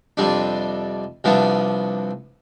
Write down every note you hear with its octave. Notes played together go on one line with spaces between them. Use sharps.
F2 C3 G3 D4
C2 C3 F3 B3 D4